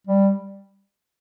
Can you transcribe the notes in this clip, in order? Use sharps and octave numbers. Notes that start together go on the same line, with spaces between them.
G3